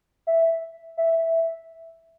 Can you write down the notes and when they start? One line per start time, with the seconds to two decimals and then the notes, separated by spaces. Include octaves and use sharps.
0.27 E5
0.97 E5